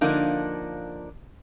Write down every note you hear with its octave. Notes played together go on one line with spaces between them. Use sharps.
D3 F3 A#3 D4 D#4